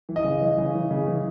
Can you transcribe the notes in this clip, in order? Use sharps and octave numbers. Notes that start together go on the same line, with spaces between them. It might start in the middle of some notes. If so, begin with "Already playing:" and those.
E3
D#5
C#3
E3
C#3
E3
C#3
E3